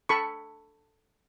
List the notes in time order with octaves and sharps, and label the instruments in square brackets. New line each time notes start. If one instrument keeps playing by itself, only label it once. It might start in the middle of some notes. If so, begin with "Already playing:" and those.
[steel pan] A4 B5 C#6